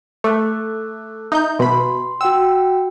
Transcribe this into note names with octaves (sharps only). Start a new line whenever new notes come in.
A3 D6 E6 F#6
D#4 E5 G6
B2 B5 C6
F#4 F#5 G5 E6